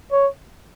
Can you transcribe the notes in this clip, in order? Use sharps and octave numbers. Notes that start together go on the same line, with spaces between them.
C#5